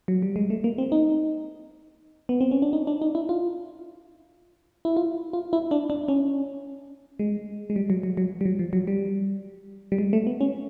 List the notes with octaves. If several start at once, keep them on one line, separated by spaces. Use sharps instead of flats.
F#3
G3
G#3
A3
A#3
C4
D#4
B3
C4
C#4
D4
D#4
D4
D#4
E4
F4
E4
F4
F4
E4
D4
D4
C#4
G#3
G#3
G3
F#3
F#3
F#3
G3
F#3
F3
F#3
G3
G3
G#3
A3
B3
C#4